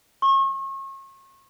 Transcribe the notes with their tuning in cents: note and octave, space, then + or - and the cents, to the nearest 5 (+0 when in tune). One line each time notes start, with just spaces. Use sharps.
C#6 -35